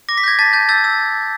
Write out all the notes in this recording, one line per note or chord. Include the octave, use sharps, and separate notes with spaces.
D6 A#6
B6
G6 G#6 A#6
A5 A6 B6
A5 G6 A6
E6 G6 A6
E6